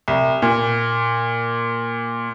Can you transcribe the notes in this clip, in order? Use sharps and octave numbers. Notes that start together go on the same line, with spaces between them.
C2
A#2